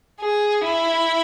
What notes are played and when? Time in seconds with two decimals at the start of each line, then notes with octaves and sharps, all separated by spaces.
0.21 G#4
0.65 E4